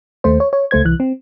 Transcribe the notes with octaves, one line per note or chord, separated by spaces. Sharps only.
D#2 A3 C5
C#5
C#5
C#2 A3 C5 G#6
C2 E3 F#6
C4